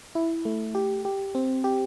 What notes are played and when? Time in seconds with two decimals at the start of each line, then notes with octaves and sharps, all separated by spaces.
0.15 E4
0.45 A3
0.75 G4
1.05 G4
1.35 C4
1.64 G4